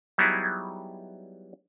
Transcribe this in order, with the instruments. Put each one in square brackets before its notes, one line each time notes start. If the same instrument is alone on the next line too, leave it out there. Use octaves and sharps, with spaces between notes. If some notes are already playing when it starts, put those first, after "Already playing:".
[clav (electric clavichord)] F#3 G3 B3 D#4 E4 G#4